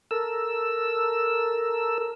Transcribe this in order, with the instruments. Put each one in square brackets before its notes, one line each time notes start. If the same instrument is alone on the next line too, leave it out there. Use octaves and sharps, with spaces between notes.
[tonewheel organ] A4 A#4 E6